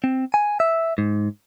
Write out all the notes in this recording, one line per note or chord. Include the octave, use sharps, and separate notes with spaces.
C4
G#5
E5
G#2